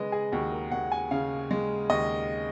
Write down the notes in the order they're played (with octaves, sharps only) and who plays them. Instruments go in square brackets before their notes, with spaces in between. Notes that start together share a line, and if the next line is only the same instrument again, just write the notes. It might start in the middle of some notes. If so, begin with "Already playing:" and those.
Already playing: [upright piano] C#3 G#3 B4 D#5
G#4
D#2 F#4
A#4
D#2 F#5
G#5
C#3 F5
G#3
D#2 D#5